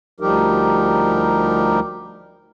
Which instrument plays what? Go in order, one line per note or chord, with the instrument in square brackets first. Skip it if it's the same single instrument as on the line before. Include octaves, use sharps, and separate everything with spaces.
[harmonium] D2 F3 G3 D#4 G4 A#4